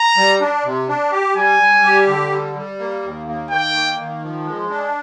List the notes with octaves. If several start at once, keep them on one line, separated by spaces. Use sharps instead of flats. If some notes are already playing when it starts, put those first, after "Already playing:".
Already playing: A#5
G3
D4
C3
D4
G4
G3 G#5
G3
G4
D3
G3
G3
A#3
D#2
A#3
D#3 G5
A#3
D#3
F3
G#3
D4